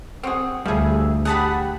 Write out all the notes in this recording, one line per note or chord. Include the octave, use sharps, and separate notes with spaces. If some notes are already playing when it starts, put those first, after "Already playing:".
C4 F#4 G#4
D2 F3 G3 G#4 E5
G4 G#4 F#5 A5 B5